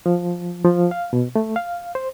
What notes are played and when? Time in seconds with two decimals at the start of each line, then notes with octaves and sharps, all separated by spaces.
0.06 F3
0.65 F3
0.91 F5
1.13 B2
1.36 A3
1.56 F5
1.95 C5